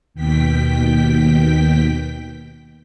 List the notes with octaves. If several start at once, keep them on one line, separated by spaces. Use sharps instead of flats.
D#2 B2 G5 B6